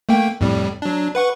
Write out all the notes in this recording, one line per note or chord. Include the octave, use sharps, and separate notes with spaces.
A3 A#3 G5
F2 A2 G3
F#3 D4
B4 F#5 C#6